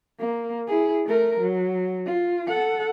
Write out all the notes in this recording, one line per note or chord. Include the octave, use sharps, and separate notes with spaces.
A#3
E4 G#4
A3 A#4
F#3
F4
A4 F#5